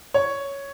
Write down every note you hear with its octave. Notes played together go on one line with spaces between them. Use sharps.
C#5